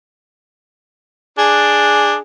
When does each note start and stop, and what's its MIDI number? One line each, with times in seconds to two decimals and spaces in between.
1.38 2.14 62
1.38 2.19 68